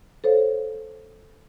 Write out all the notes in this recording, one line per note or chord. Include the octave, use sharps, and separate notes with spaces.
A4 C5 C#5 F5